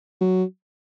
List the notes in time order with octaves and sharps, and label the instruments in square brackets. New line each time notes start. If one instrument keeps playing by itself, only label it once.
[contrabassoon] F#3